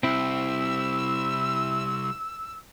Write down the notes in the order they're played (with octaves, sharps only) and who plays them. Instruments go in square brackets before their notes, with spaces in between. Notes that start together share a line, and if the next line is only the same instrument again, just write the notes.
[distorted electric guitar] C2 [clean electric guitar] C4 E4 [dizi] E6